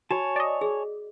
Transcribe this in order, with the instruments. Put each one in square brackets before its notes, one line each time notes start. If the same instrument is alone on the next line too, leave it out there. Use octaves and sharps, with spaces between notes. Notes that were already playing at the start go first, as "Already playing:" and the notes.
[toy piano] F#4 [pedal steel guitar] C#5 G#5 A5
[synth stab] D5 D#5
[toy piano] G#4